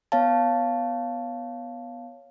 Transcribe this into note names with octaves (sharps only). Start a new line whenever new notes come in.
B3 C#5 F5 A5